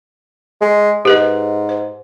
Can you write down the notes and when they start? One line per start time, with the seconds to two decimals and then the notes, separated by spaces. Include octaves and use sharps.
0.61 G#3
1.05 G#2 G4 B4 D#5
1.69 C5